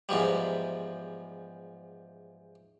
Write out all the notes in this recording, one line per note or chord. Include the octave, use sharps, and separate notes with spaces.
E2 G#2 F3 G3